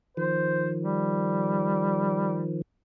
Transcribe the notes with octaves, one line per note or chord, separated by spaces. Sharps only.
D#3 F3 C5
G3